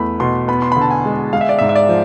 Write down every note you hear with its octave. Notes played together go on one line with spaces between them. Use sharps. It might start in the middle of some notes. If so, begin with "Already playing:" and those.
Already playing: E2 A3 B5
B2 C6
B3 B5
C6
B5
D3
A5
G#5
G#3
G#3 F5
E5
D5
G#2 E5
E5
D5
F3